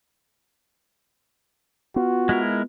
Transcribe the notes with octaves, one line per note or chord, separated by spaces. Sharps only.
B3 F4 F#4
G#3 E4 A#4